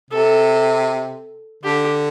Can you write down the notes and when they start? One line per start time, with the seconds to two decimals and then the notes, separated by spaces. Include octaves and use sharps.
0.11 C3 A4
1.63 D3 G4